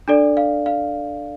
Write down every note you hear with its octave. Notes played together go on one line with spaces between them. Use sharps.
D4 A4 D5
F5
F5